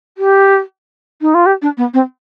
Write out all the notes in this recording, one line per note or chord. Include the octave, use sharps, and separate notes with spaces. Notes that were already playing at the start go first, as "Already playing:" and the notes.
G4
D#4
F4
G4
D4
B3
C4